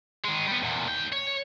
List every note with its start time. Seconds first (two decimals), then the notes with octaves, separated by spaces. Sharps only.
0.25 D#3 G#3
0.48 G3 B3
0.63 E2 A#2
0.88 D#2 G5
1.12 C#5